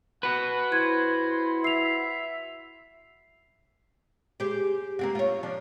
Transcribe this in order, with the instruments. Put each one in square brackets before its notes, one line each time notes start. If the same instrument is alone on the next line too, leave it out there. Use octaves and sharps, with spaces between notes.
[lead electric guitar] F#4 B4 [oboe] F#5
[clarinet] E4 [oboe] C5 [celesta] G#6
[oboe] E5 [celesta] C7 F7
[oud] G4 G#4 C5
A#3 C4 F#4
F4 C#5
F3 D4